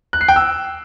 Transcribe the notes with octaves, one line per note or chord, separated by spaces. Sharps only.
F#6
C7
G5
E6